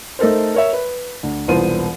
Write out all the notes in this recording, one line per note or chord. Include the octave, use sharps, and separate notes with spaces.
A3 D#4 A4 A#4 C5
A#4 C#5 E5
B4
D2
E1 C2 B3 F4 C5 D#7